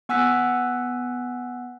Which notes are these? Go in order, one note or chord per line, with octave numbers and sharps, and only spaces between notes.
B3 F#5 G#5 E6 F#6 B6